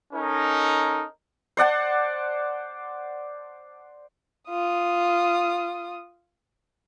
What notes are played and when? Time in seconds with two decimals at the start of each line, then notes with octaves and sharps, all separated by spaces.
0.13 C#4 D#4 A4 A#4
1.57 C5 D5 F#5 A5
4.49 F4 D#6